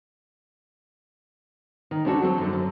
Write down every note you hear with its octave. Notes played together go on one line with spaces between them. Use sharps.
D#3
D2 C#4 D4 F#4 A4
F#3 C4 A4
F#2 D3
F#2